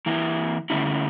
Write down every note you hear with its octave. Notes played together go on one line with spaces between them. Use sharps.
E3 A#3 E4
D3 A3 C#4 E4